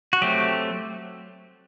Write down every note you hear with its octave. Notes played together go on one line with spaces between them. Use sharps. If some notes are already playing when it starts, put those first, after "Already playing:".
F#4
F#3 A3 C4 G4